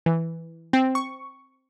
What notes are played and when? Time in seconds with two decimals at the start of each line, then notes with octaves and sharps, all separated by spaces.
0.06 E3
0.73 C4
0.95 C#6